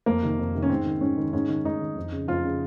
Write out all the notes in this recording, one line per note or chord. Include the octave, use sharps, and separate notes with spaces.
F2 A#3
C3 D#3
F2
C3 D#3
C#4
G#2 C4
D#3
G#2 C#4
D#3
G#2 C#4
D#3
G#2 D#4
D#3
F2
C#3
F2 F4
C#3